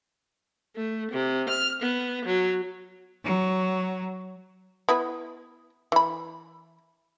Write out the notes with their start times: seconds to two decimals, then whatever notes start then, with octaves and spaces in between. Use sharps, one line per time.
0.76 A3
1.12 C3
1.49 F6
1.82 B3
2.24 F#3
3.24 F#3
4.89 B3 E4 B4
5.92 E3 B5